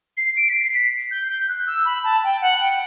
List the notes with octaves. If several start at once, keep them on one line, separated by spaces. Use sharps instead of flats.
C7
D7
B6
C7
B6
G6
G6
F#6
E6
B5
A5
G5
F#5
G5